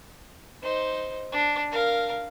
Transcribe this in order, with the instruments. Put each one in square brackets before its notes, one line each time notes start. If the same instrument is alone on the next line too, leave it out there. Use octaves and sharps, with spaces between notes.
[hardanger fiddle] D#4 C5
D4
A#4 F5